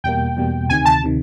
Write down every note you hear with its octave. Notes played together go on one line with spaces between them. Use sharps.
E2 B2 G3 A#3 G5
E2 B2 G3 A#3
D2 C3 D#3 G#5
A5
C3 D#3